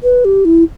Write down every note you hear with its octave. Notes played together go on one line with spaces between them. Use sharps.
B4
G4
E4